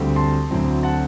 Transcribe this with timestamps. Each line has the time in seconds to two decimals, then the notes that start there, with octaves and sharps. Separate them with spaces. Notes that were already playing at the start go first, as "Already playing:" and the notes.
Already playing: D2 D3 G3 C4
0.16 A5 C6
0.50 D2 D3 F#3 C4 E4
0.83 F#5 A5